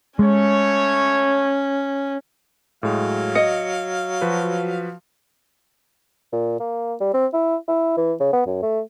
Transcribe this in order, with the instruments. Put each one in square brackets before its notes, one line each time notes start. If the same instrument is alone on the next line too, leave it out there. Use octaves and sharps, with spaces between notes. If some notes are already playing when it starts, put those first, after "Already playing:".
[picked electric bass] G#3 [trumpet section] A3 C#5 [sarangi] C#4
[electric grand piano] A2 G#3 [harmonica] F#3 F5
[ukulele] D#5 [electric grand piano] C#7
[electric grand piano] F3 F#4 B4
[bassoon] A#2
A#3
G3
C4
E4
E4
E3
C#3
B3
F#2
A3